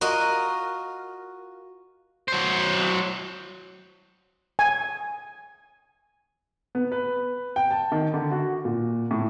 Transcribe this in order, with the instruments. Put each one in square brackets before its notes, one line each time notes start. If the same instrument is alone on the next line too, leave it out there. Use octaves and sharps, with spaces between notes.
[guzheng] F4 F#4 A#4 D#5
[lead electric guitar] F#3 C5
[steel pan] G#5
[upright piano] B3
B4
G5
A5
D#3
D3
F#4
A#2
A2